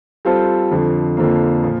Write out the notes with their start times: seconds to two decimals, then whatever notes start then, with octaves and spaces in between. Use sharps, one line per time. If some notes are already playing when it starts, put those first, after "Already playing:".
0.25 G3 C4 F4 A4 C5
0.71 F2 D3 F3
1.17 F2 D3 F3 A#3
1.63 A#2 F3